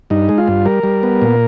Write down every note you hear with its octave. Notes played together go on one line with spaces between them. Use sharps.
G2 D#4
G#3
F4
G2
G3 A#4
G3
B3
A#2